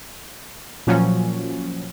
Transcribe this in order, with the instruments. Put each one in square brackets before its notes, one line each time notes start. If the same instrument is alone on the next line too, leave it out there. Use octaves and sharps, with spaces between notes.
[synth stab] A#2 F3 F#3 C#4